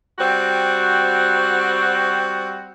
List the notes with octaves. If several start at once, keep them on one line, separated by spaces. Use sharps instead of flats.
G3 C4 F#4